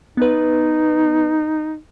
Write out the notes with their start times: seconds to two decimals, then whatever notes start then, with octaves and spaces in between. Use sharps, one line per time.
0.17 B3 D#4 B4